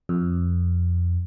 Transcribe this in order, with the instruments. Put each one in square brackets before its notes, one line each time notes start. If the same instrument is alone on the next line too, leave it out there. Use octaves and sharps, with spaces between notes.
[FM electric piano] F2